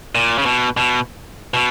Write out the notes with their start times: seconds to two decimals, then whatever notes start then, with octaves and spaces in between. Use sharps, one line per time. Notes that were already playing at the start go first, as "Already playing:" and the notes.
0.15 A#2
0.38 C#3
0.45 B2
0.77 B2
1.54 B2